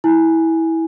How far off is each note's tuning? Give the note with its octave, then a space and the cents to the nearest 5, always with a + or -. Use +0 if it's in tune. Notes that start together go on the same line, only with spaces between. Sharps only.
E4 -20 G#5 +0